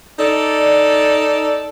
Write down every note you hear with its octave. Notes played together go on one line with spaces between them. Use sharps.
D#4 A4 D5